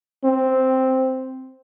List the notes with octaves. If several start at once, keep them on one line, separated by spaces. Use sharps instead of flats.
C4